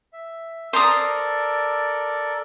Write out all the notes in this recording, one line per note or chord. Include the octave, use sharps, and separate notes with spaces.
E5
A4 A#4 C5 D5 A#5 D#6